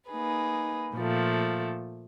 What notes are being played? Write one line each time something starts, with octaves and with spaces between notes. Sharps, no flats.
A#3 D#4 G#4 B4
A#2 F3 A3